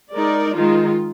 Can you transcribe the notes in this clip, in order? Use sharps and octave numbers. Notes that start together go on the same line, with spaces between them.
G#3 D#4 A#4 D5
D#3 G#3 D#4 F4